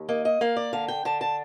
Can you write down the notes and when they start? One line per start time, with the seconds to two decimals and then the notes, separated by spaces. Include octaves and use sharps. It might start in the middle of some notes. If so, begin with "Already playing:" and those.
Already playing: D#2
0.09 A#3 D#5
0.25 D#5
0.41 A#3 F5
0.56 D5
0.73 D3 F5
0.88 G5
1.05 D3 A5
1.21 A5